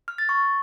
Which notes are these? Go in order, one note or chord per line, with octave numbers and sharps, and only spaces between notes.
F6
A6
C#6